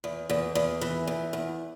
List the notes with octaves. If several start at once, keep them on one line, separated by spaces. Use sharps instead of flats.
E2
E2
E2
E3
E2
E2